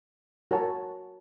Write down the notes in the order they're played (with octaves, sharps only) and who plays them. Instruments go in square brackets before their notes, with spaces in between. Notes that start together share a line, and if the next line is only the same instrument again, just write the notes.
[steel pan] F#4 A#4 C#5 F#5 A5